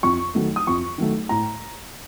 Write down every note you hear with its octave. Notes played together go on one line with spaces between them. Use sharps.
F2 C#6
D#3 F#3 A3
D#6
F2 C#6
D#3 F#3 A3
A2 A#5